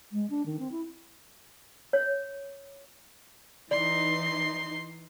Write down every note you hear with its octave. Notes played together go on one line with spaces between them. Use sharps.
G#3
D4
D#3
C4
E4
C#5
E3 D#4 D5 C6